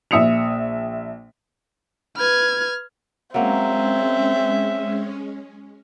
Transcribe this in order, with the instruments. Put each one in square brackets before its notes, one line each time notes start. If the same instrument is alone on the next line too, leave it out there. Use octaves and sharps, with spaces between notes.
[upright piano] A#1 E5 D#6 C#7 F7
[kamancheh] B4 [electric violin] F6 G#6
[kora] F#3 A#3 [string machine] G#3 C#4 [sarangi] C4 [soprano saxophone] E5